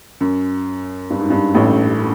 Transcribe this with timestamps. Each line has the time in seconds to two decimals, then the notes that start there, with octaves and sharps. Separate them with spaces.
0.21 F#2
1.10 G2
1.20 G#2
1.30 G2
1.54 A1 A2